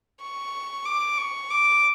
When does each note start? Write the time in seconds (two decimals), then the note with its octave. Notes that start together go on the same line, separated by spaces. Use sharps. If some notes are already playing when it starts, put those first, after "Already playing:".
0.21 C#6
0.86 D6
1.18 C#6
1.50 D6